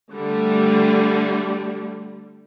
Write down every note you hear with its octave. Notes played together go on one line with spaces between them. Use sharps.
D3 G3 A3